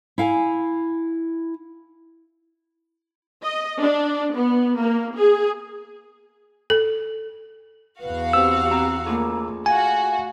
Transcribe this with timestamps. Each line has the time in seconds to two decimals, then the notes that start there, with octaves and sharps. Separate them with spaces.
0.18 E4 F5 G#5
3.44 D#5
3.82 D4
4.36 B3
4.79 A#3
5.18 G#4
6.70 A4
8.00 E2 F#4 B4 F5
8.33 B3 C4 G4 E6
8.71 C4 A#5
9.06 A3 A#3 F4 G#4
9.66 F#4 F5 G#5